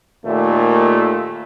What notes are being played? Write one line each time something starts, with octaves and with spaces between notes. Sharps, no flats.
D#2 A#2 A3